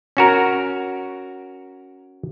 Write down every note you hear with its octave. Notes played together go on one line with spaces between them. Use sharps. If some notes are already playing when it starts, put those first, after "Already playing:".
C#4 F#4 A#4